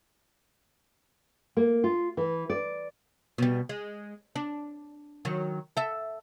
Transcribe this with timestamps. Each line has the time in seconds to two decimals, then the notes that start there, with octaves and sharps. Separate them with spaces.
1.57 A#3
1.84 F4
2.17 E3
2.50 D5
3.38 B2 G3
3.69 G#3
4.36 D4
5.25 D#3 F#3
5.77 A4 E5